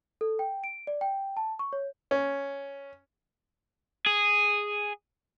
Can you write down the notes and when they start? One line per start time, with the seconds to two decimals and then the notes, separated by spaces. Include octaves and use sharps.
0.21 A4
0.39 G5
0.64 D7
0.87 D5
1.01 G5
1.37 A5
1.59 C#6
1.73 C#5
2.11 C#4
4.06 G#4